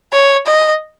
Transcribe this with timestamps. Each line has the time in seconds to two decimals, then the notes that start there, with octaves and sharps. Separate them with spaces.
0.13 C#5
0.46 D#5